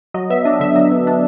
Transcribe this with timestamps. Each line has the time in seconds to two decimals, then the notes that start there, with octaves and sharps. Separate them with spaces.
0.14 F#3 D#5
0.30 B3 E5
0.45 D4 D#5
0.60 D3 E5
0.76 F#3 D#5
0.91 B3
1.07 D4